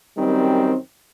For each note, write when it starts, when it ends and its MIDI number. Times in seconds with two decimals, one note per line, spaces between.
0.18 0.75 42
0.18 0.75 51
0.18 0.75 55
0.18 0.75 60